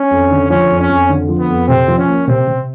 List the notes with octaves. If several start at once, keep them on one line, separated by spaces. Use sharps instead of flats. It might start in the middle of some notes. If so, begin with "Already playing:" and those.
Already playing: C#4
F2
D3
F3 C#4
F2
C#4
F2
D3
F3
B3
F2
C3 C4
F3
C#4
A#3
C3 C4
C3